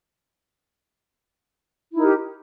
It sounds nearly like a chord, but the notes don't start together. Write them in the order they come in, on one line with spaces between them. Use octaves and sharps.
E4 D#4 A#4 G4